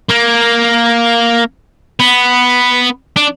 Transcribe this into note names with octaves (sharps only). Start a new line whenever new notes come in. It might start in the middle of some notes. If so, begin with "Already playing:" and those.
A#3
B3
D4